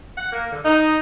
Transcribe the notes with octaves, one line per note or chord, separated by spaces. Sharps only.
F#5
A#3
D3
D#4